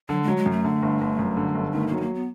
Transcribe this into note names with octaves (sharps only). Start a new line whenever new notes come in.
D3 F#3
G#3
F#3
G#3
F#2
A3
D3
G1
G1
F#2
D3
G1
D#3 A3
F#3 A#3
B3
A#3
B3